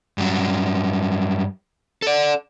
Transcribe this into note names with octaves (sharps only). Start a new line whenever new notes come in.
G2 F#3
A4 D5